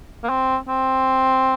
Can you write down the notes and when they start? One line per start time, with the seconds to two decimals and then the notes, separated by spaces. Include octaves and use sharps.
0.24 A#3
0.29 C4
0.68 C4